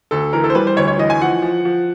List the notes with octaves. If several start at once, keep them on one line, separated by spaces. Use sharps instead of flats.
D2 A4
E3 A#4
A4
C5
G3 B4
C5
D2 C#5
C#5
E3 D#5
G#5
F3 F#5
F3
F3